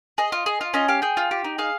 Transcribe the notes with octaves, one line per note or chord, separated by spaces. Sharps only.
G#4 D#5
F4
G#4
F4
C#4 D#5
G4 F5
G#4 G5
F4
G4
D#4
G#4 F5